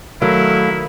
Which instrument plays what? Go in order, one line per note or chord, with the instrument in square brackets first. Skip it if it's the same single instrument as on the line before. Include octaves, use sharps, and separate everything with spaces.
[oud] D#3 [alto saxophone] F#3 [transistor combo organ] A3 F5 [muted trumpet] E4